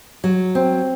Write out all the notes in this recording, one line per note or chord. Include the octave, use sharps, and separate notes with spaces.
F#3
C4